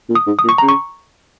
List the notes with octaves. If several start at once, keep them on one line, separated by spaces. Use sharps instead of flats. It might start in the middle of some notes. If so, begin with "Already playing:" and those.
A#2
D#6
G#2
D#6
A#2
C#6
C#3 A#5
C#6